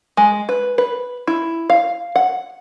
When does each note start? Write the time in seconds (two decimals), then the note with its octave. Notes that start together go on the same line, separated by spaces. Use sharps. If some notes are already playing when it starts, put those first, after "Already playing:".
0.17 G#3
0.49 B4
0.78 B4
1.27 E4
1.70 F5
2.16 F#5